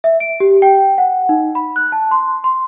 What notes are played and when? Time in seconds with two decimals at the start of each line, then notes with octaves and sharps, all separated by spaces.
0.04 E5
0.20 D7
0.40 G4
0.62 G5
0.98 F#5
1.29 D#4
1.55 B5
1.76 F#6
1.92 A5
2.11 C6
2.44 C6